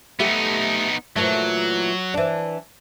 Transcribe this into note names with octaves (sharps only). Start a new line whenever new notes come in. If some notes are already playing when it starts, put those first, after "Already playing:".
A3 B3 D#4 G4
A#2 E3 F#3 A3
E3 D4